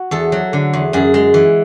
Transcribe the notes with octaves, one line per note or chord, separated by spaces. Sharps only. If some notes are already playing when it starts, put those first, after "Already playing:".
Already playing: F#4
E2 A4
F#3
D3
E2
F#2 G#4
G#3
E3